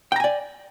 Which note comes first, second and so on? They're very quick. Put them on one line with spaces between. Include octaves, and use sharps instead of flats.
G5 A#5 G#5 D5